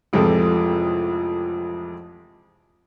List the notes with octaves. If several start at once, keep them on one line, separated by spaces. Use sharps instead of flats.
A1 F2 C3 F3 G#3 A4